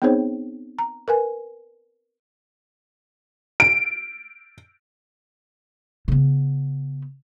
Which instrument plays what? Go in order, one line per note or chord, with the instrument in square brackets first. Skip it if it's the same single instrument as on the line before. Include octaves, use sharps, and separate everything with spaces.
[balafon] B3 C4 D#4 G#4 C5 C#5
A#5
A#4 B4 G#5
[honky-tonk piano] D7
[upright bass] C#3 B3